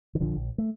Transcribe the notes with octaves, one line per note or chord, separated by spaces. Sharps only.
D#3
A#1 D3 F3
A#1
A3